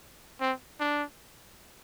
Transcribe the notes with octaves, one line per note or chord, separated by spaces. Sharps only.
C4
D4